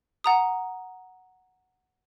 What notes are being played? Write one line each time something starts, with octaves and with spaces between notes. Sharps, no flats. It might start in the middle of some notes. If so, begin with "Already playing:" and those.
F#5 A#5 D#6